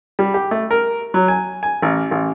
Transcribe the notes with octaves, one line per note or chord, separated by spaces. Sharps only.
G3
G4
A3
A#4
F#3
G#5
G#5
A1
A1